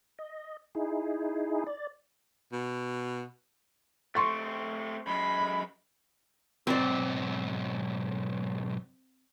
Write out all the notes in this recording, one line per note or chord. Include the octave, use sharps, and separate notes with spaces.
D#5
D#4 E4 G#4
D5
B2
A3 C4 C6 C#6 A6
F#2 G#3 B5
B1 G#2 C4 D5